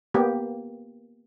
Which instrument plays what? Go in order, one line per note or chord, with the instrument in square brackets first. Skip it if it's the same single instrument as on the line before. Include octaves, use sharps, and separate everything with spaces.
[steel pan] A#3 B3 G4